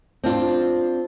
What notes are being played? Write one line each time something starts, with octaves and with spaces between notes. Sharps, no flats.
C4 D4 F4